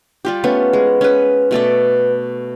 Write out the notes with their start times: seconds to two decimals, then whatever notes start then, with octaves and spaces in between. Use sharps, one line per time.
0.25 G3 F4 G4
0.44 A3 B3 C#4
0.73 G#3
1.01 C#4 B4
1.51 B2 A3 A4 D5